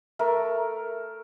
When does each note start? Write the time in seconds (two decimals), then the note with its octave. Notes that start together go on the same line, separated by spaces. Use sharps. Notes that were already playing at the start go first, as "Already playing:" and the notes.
0.19 A3 A#4